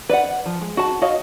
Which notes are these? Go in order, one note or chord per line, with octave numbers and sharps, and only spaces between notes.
B4 D5 E5 F#5
F3
G#3
F#4 A5
F#4 C#5 D#5 F5